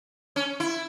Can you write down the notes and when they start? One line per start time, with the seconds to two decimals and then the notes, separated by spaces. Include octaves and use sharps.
0.36 C#4
0.60 E4